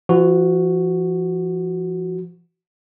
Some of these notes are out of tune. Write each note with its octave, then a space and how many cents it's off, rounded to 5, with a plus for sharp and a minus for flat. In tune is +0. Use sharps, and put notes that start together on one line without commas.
F3 -40 F#4 +0